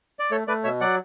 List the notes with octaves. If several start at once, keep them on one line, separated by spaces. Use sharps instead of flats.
D5
A3 A4 C#5
A3 B4 D5
B2 C#5 E5
F#3 D5 F#5